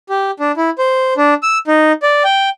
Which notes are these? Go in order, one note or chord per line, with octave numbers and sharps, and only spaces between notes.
G4
D4
E4
C5
D4
E6
D#4
D5
G5